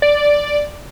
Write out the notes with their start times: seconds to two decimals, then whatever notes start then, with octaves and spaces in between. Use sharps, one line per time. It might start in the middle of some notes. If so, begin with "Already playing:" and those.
0.02 D5